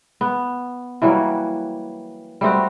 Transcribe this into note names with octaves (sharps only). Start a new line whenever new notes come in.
B3
E3 F#3 G3 A#3
G3 A3 C4 F#4